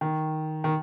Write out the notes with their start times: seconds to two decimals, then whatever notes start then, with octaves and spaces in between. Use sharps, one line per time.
0.01 D#3
0.64 D#3